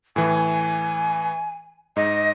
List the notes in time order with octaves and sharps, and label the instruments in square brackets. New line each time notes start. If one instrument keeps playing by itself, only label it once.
[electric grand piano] A2 E3 [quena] G#5
[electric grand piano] G#2 [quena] D#5